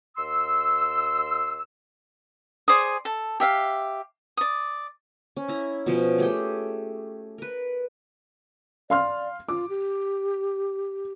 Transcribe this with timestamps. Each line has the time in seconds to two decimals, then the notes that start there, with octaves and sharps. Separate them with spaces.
0.16 D#2 C6 E6
2.68 G#4 C5 D5 D#6
3.05 A4
3.40 G4 E5 F5
4.37 D5 D#6
5.37 C#4
5.48 E4 A#5
5.86 B2 F3 C#4
6.18 A3 G4 G#4 G5
7.38 A#4 B4
8.90 D5 F5 C6 F6
9.49 F4 D6
9.69 G4